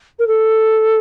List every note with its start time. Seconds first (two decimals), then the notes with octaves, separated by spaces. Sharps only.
0.19 A#4
0.27 A4